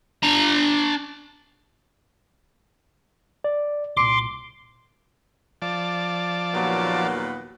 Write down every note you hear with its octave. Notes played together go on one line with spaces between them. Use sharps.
D4 A#5
D5
C2 A#2 C6 D6
F3 D5 A5
D#2 A#2 F#3 B3